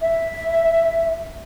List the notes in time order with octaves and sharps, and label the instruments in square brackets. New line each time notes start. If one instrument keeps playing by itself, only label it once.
[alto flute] E5